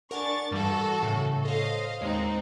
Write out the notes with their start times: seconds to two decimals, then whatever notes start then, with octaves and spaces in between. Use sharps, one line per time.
0.11 D4 A#4 F#5 G#5 C#6 A6
0.51 G2 E3 G3 F#4 A4
1.02 A2 C#3
1.45 A4 C5 C#5 D#5 F5
2.01 D#2 G#3 C4 D#4 C7